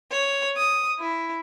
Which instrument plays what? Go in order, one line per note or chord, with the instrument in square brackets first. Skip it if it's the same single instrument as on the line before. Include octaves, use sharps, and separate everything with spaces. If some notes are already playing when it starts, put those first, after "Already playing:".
[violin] C#5
D#6
E4